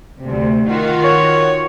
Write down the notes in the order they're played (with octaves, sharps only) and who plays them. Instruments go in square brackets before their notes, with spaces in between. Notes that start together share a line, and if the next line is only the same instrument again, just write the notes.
[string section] D2 C3
D#3 F4 F#4
[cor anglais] C#5